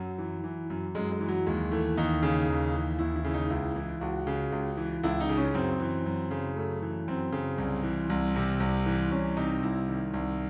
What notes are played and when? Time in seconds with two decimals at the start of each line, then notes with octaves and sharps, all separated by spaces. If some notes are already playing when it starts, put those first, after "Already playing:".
Already playing: F#2 F#3
0.18 E3
0.44 E3
0.70 F#2
0.95 F#2 G#3
1.12 G#3
1.20 E3
1.28 F#3
1.47 D#2 G#3
1.71 E3 A3
1.97 D#2 D#4
2.23 C#3
2.48 D#2
2.74 E3
2.99 D#2 E4
3.16 E4
3.25 C#3
3.34 D#4
3.50 C#2 E4
3.76 E3 E4
4.01 C#2 F#4
4.27 C#3
4.52 C#2
4.77 E3
5.03 C#2 E4
5.20 D#4
5.29 C#3
5.37 C#4
5.54 F#2 C4
5.80 E3
6.06 F#2
6.31 C#3
6.56 F#2 A3
6.82 E3
7.08 F#2 C4
7.32 C#3
7.58 C2
7.83 E3
8.10 C2
8.36 C3
8.60 C2
8.86 E3
9.11 C2 C#4
9.37 C3 D#4
9.63 C2 E4
9.88 D#3
10.14 C2